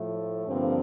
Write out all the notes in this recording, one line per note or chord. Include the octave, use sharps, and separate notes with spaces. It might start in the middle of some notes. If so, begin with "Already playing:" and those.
Already playing: A2 F3 A3
G2 D3 F3 A#3 C4